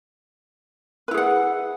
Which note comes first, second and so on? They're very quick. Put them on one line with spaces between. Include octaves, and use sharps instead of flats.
B4 E4 G#4 F#5